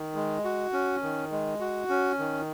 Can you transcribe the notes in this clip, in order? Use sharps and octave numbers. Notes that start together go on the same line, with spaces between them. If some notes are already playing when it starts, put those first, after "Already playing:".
Already playing: D#3
G#3
F#4
C#4
D#3
G#3
F#4
C#4
D#3